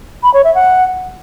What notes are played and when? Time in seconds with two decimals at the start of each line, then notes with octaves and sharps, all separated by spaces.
0.23 B5
0.34 C#5
0.44 E5
0.55 F#5